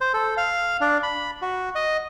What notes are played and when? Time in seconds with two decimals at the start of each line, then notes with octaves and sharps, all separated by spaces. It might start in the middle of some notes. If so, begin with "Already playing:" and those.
0.01 C5
0.13 A4
0.37 F5
0.81 D4
1.03 B5
1.42 F#4
1.75 D#5